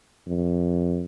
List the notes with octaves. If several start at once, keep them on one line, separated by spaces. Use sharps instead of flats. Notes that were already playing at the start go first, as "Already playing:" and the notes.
F2